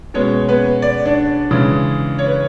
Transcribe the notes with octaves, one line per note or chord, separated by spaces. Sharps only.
B2 G#3 B3 C#4 C#5
B3 B4
D5
D4 D5
C#3 E3 G#3
C#5
B4